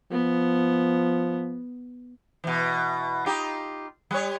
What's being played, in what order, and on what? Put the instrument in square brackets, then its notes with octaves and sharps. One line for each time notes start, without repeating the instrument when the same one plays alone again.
[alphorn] F3 [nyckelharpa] B3
[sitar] B2 E3
D#4 F4 G4
G3 C#5